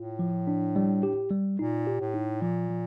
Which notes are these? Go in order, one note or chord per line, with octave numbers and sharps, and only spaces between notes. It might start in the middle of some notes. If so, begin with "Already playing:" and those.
Already playing: A2 F4
F3
D4
G3
G4
G3
A#2 D#4
G4
A2
D#4
A#2 F3
F3